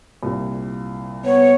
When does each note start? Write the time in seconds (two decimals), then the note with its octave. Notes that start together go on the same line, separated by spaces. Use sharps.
0.23 C2 A#2
1.25 B3 C#5